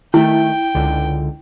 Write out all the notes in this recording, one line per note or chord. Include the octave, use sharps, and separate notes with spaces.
D#3 A3 E4 G5
C#2 D3